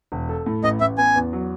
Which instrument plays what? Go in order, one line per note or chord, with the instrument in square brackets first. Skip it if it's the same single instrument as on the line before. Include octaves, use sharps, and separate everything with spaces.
[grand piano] E1
A4
A2
[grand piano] A1 [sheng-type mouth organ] D#5
[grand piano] A1 [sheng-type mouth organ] E5
[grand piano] B3 [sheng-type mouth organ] G#5
[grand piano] E2
F#3